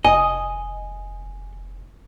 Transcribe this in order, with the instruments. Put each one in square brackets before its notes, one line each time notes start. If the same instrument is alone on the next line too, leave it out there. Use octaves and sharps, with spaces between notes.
[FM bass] F1 [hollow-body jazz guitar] D#5 [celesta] G#5